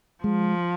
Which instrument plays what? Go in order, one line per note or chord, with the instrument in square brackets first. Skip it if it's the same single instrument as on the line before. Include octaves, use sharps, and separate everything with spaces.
[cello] F3 [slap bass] G#3